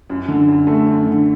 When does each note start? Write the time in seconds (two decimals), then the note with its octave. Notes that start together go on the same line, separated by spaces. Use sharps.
0.10 F#2
0.28 D3
0.48 F#2
0.67 A3
0.86 F#2
1.06 D3